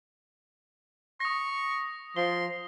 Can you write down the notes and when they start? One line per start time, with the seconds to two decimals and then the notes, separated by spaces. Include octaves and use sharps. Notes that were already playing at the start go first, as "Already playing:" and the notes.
1.20 C#6 D#6 A#6
2.17 F3 C6 G7